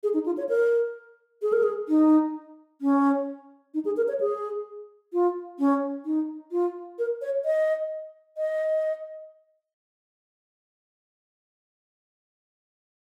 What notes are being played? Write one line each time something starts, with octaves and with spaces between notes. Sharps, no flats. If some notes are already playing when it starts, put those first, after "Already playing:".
G#4
D#4
F4
C#5
A#4
G#4
A#4
G#4
D#4
C#4
D#4
G#4
A#4
C#5
G#4
F4
C#4
D#4
F4
A#4
C#5
D#5
D#5